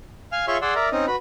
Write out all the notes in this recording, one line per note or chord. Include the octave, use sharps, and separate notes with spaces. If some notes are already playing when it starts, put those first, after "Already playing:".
F5 G#5 F6
F4 G#4 C#5 E5 C6 C#6
G#4 D5 F#5 C6 E6
A#4 D5 E5 A#5
C4 C#4 D#4 D#5
F#4 B4 B5